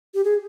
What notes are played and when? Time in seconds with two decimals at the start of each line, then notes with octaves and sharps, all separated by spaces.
0.14 G4
0.24 G#4